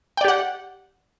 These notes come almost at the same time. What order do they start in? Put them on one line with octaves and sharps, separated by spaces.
G5 D5 G4 F#5